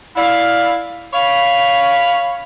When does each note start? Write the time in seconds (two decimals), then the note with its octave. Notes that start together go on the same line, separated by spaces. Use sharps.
0.16 E4 D5 F5
1.13 C#5 F5 B5